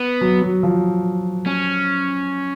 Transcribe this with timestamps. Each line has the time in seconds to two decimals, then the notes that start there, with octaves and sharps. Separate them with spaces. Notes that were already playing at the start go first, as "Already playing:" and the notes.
Already playing: B3
0.21 F#3
0.42 F#3
0.63 F3
1.46 C#4